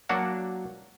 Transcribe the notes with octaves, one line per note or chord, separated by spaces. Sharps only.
F#3 A#3 D4 F#4 F#5